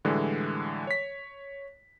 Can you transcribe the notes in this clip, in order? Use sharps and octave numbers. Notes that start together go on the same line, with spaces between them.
A2 D3 E3 G3 G#3
C#5 B6